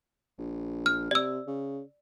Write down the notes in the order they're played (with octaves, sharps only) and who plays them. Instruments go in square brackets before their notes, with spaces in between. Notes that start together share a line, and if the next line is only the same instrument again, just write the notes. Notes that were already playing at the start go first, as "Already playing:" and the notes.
[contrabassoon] A#1
[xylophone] F6
[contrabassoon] C3 [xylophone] D5 E6
[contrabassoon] C#3